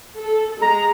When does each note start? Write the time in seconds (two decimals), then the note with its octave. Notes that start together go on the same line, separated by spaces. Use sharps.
0.18 A4
0.62 G#3 A#5